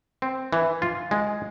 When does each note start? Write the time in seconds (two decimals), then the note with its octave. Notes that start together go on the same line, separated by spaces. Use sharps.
0.22 C4
0.53 E3
0.82 F4
1.11 G#3